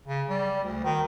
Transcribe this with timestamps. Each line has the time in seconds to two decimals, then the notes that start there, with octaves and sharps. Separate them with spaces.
0.07 C#3
0.29 G3
0.63 D2
0.84 D#3